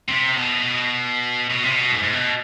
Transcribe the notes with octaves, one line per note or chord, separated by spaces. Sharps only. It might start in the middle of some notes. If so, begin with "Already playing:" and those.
C3
B2
B2
C3
B2
G#2
G#2
B2